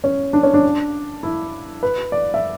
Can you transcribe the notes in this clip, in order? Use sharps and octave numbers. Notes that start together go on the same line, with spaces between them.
C#4
D4
C#4
D4
E4
B4
D5
E5